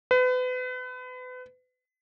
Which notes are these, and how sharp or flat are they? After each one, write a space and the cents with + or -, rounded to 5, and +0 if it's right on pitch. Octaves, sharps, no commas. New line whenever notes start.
B4 +35